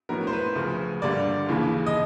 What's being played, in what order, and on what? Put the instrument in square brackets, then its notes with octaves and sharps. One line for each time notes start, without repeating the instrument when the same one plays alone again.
[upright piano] A2 F#3 B3 A#4
C5
B4
D2 C#3 F3
G2 D3 G3 A#3 D5
D#2 C#3 E3
D#5